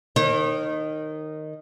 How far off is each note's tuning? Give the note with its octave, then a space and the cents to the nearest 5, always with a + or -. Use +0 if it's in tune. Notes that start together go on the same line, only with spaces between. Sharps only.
D#3 -10 C#5 -45